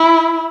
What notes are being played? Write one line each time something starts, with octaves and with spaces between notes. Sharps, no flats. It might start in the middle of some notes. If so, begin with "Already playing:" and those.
Already playing: E4